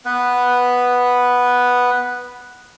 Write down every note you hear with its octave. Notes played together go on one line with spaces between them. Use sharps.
B3 B4